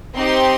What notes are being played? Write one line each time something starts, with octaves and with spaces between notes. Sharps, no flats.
C4 D#4 G4 C6